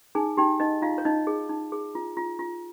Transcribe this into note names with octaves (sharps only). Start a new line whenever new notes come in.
D#4 G#4 G#5
D#4 G4 G5
D#4 D#5
D#4 F4 F5
C#5
D#4 D#5
G#4
D#4
G#4
F4
F4
F4